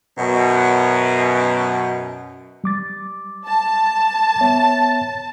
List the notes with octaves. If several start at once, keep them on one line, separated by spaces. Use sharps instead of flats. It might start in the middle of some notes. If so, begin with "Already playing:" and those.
F#2 B2
G3 D6 A6
A5
B3 C#5 E5